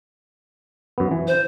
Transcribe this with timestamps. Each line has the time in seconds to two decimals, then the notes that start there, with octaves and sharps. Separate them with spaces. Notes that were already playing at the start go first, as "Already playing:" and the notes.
0.98 F#2 B3
1.11 E3
1.27 C5